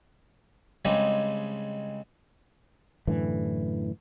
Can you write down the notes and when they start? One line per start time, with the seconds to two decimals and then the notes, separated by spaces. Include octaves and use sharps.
0.85 C#3 G3 G#3 C4 D#4
3.07 F#2 A2 D3 E3